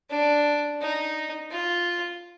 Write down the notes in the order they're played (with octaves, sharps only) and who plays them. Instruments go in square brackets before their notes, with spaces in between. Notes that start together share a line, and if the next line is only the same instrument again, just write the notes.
[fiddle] D4
D#4
F4